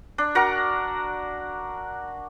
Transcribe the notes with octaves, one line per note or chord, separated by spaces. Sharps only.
D4
F#4 A#4 F#5 A#5